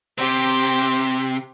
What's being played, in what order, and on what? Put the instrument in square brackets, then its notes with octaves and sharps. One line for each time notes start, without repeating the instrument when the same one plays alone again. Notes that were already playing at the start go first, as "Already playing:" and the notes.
[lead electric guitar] C3 [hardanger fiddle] G4 C5